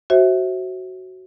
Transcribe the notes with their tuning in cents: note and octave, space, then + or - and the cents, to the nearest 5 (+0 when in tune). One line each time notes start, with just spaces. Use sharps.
F#4 +10 C5 +25 E5 -15